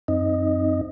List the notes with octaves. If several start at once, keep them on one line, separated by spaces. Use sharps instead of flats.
F#2 C4 D#4 D#5